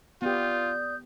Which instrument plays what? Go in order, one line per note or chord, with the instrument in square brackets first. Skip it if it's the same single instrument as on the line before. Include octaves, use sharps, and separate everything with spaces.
[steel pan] B3 G4 [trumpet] F4 [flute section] D5 D#6 G6